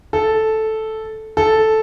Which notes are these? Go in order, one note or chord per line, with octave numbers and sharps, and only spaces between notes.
A4
A4